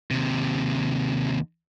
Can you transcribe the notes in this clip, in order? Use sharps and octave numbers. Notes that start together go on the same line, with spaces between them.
D#2 C3